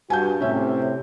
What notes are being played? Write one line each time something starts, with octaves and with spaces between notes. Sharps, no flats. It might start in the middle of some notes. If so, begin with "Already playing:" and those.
G2 F#4 G#5 A5 G6
A2 C3 C#4 E5